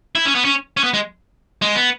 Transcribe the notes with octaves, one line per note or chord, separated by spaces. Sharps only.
E4
C#4
B3
C#4
C#4
B3
G#3
G#3
B3